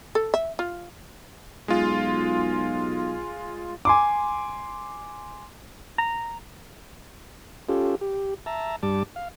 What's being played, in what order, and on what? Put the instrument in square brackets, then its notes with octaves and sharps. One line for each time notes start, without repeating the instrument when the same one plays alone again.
[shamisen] A4
E5
F4
[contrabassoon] B1 [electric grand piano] G#3 F4
[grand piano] G#5 C6 D6
[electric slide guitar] A#5
[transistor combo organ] C#4 F4 G4 A4
G4
E5 A5 A#5
G2 G3 A5 D6
F5